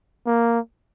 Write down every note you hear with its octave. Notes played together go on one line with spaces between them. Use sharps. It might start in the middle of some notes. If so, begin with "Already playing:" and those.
A#3